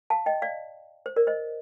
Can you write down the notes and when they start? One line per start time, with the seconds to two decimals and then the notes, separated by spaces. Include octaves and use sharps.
0.10 F5 A5
0.26 D#5 G5
0.42 D5 F5
1.06 C5
1.16 A#4 D5
1.27 C5 D#5